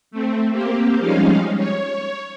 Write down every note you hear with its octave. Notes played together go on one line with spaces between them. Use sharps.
A3 C4
A#3 C4 G4
F3 G3 G#3 C#4 D#4 F5
C#5